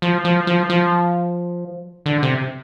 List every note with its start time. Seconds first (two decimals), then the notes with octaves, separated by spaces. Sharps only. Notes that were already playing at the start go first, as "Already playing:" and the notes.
0.02 F3
0.25 F3
0.47 F3
0.69 F3
2.06 D3
2.23 C3